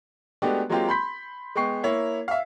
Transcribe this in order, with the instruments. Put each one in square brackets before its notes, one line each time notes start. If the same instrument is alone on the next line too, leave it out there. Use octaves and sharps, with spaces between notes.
[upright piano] G#3 A3 B3 D4 F#4 G4
F#3 G#3 A#3 C4 F4 G4
B5 C6 G6 B6
G#3 B3 G5 C#6 C7
A#3 E4 C#5
E5 F5